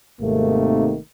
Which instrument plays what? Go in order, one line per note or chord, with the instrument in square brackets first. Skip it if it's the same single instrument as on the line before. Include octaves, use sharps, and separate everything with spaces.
[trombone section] G#1 G#2 C3 D#3 A3 A#3